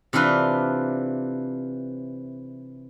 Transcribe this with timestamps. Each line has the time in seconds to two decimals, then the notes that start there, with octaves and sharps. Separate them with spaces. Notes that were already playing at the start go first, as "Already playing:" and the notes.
0.13 C3 E3 D4 F4 B4